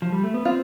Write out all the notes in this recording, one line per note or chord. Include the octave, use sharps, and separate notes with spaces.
F3
G3
A3
B3
C4 F4